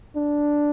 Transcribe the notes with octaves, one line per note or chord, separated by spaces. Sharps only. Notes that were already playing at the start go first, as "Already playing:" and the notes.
D4